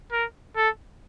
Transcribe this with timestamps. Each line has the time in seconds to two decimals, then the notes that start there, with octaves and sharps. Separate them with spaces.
0.12 A#4
0.56 A4